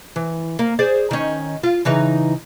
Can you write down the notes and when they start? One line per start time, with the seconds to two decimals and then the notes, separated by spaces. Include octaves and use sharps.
0.16 E3
0.59 A#3
0.79 G#4 C5 D5
1.11 D#3 C#4
1.63 F4
1.85 C#3 E3 D#4